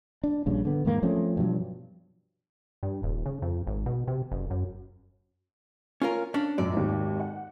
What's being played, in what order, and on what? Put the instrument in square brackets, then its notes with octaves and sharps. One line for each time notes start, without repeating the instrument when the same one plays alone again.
[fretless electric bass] D4
A#1 G2 C#3
D3 B3
E2 G#2 D#3 A#3
F3 A3 C4 C#4
G2 B2 F3 F#3
[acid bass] G2
D#1
C#3
F2
G#1
B2
C3
F#1
F#2
[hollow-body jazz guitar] C#4 F4 A#4
C#4 D4
[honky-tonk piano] F#2 A#2 [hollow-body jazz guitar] D5
[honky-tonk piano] G#1 D#2
F#5